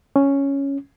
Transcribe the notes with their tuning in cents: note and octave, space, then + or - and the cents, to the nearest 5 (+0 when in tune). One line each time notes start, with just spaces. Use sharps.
C#4 +0